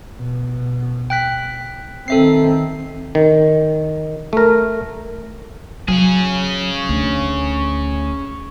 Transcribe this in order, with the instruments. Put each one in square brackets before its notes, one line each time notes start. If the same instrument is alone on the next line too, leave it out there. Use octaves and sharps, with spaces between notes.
[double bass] B2
[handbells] G5 F#6 B6
[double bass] D#3 C4 [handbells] A4 E5 C7
[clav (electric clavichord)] D#3
A3 A#4
[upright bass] F#3 [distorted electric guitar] C#4 G#4
[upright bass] D2